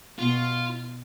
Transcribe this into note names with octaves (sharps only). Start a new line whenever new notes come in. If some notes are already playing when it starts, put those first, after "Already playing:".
B2 F4